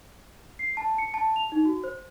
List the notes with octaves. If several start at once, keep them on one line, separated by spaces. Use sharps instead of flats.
C7
A5
C#7
A5
F7
D#4
F#4
C5